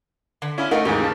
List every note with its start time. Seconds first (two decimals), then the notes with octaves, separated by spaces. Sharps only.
0.42 D3
0.58 C#4 E4 F4
0.71 A3 D#4 F4 A#4 F#5
0.85 D#2 G#2 E3 G4
1.00 C#3 A#3 A5